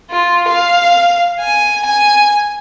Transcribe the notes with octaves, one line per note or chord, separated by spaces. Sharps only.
F4
F5
G#5
G#5